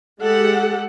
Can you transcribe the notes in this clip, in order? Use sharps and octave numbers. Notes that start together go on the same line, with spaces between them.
G#3 G4 A4 F#5